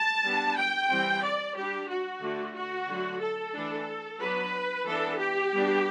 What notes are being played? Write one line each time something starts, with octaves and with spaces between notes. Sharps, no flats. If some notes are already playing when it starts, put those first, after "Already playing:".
Already playing: A5
G3 B3 D4
G5
E3 G3 C4
D5
G3 D4 G4
F#4
D3 A3 D4
F#4
D3 F#3 A3
A4
E3 A3 D4
F#3 B3 D4 B4
E3 B3 D4 A4
G4
G3 B3 D4